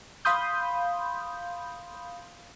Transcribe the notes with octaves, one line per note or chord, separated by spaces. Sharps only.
F5 B5 C6 D#6 G6